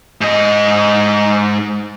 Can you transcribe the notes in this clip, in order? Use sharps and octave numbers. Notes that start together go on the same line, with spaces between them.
G#2 D#5